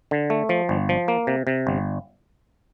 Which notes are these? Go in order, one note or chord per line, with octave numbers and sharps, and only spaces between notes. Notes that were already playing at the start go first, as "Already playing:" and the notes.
D3
A3
F3
G1
F3
A#3
C3
C3
G1